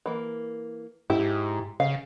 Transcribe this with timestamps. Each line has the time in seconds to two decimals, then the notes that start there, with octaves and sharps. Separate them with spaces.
0.06 E3 A#3
1.10 G#2 E4 G4
1.80 C#3 F5